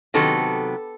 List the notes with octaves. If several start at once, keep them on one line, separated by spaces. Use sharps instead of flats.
C3 D#3 F#3 B3 A4